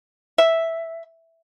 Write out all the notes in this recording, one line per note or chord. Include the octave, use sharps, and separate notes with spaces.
E5